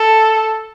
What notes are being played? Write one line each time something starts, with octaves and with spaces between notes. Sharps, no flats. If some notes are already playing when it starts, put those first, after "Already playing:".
Already playing: A4